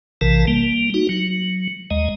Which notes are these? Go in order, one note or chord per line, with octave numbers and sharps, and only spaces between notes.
A#1 C3 E3 A#4 A5
G3 A#3
D#4 F#4
F#3
D#2 G#3 D#5